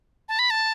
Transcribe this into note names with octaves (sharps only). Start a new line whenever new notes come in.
A5
B5
A5